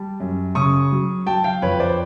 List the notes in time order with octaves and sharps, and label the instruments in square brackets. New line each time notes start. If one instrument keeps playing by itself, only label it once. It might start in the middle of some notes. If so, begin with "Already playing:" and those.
Already playing: [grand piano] G3 A5
F#2
C#3 C#6 D#6
F#3
F#3 G5 A5
F5 G5
F2 B4 C#5
C5 D5